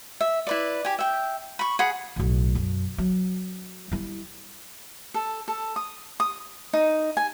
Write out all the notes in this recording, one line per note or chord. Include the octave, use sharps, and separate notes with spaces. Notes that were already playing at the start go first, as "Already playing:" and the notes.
E5
E4 B4 D5
G4 G#5
E5 G5
B5 C#6
G#4 F#5 B5
B1 A2
F#2
F#3
G3 E4
A4
A4
D#6
D#6
D#4
G#5